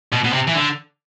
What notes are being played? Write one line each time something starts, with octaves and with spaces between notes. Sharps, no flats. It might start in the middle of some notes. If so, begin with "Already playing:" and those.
B2
B2
C3
E3
D3